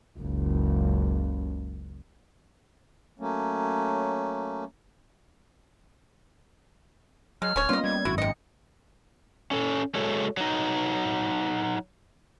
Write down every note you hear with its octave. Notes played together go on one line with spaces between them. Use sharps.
F#1 C#2
F#3 A3 A#3 C#4
F#3 G#3 F6
D1 C#4 C#5
G3 A#3 B3 C#4 F4 D#5
G3 G#6
G#1 F#2 E4 F#4
G#2 C3 D#5 C#7
C#4 A4
G#3 A3 F#4 A4 C#5
F#3 D#4